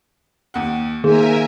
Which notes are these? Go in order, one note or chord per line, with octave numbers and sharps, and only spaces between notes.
D#2 F#5
D#3 A#3 G#4 A#4 C5 E5 G#5